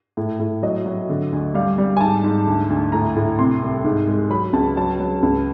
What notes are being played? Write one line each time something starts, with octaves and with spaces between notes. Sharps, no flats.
A2
A2
F#3 D#5
F#3
D3
D2
G3 F5
G3
G#5
G#2 A5
G#2
D2
D2
A2 A#5
A2
C3 C6
C2
G#2
G#3
F#3 B5
C#2 A5
F#3 A5
F#3
C#2